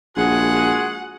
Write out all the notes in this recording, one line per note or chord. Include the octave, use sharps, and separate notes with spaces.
A#1 G#3 F#4 G#4 F#5